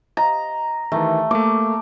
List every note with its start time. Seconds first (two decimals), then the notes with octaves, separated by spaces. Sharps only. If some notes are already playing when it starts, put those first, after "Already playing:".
0.17 D#5 A#5
0.92 D#3 E3 A3
1.31 A3 A#3 D6